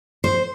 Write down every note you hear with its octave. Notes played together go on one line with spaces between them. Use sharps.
C5